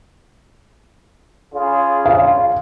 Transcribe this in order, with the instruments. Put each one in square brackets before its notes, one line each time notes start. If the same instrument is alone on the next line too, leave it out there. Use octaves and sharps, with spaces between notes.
[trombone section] C#3 F4 G#4
[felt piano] F5